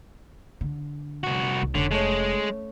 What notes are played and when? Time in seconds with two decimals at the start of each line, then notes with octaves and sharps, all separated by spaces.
0.61 D3
1.24 C2 F#4
1.62 C2
1.75 F1 D3 C#4 B6
1.91 G#3 A3 C#5